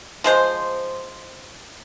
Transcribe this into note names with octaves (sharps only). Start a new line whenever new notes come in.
F3 G#3 C5